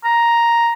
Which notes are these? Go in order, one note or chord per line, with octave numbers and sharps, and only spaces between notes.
A#5